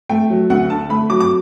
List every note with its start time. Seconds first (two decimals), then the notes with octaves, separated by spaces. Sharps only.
0.09 A3 G5
0.30 F#3
0.50 D2 F#5
0.70 D3 A5
0.89 A3 B5
1.10 F#3 D6
1.20 D6